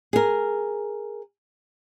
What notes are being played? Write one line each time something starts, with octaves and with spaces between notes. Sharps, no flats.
G#4 A#4